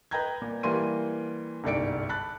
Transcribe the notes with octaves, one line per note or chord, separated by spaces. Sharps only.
B4 D#5 G5 A#5 G6 G#6
A#2
E3 G3 A#3 C6 D#7
G1 C2 G#2 D5 C#7 D7
A5 B5 F#6 A6